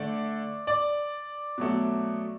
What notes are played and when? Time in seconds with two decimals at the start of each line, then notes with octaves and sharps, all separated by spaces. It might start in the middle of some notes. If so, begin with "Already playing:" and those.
Already playing: D3 A3 D5
0.67 D5
1.58 B2 F#3 A3